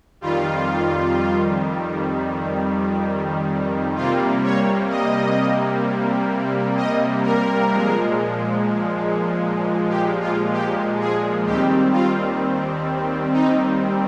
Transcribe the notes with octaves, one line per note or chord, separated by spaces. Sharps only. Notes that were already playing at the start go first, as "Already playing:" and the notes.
F2 D#3 G3 F4
C3 G3 A#3 F4
C#5
D#5
D#5
A#4
A#2 F3 G#3
G4
F4
G4
G#4
D#2 D#3 G3 C4 G4
F4
D#4